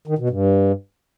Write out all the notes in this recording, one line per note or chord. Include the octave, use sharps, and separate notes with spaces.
D#3
B2
G2